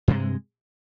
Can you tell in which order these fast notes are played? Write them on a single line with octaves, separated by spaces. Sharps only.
G2 C3 G#3